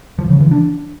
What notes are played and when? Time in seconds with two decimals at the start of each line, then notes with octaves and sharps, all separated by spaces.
0.19 F3
0.29 C#3
0.40 E3
0.51 D4